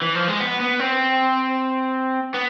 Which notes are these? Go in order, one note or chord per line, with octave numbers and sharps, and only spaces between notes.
E3
F3
G#3
B3
B3
C4
B3